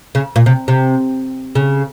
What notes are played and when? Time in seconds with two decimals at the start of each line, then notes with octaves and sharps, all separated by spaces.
0.15 C#3
0.36 A#2
0.46 C3
0.68 C3
1.55 C#3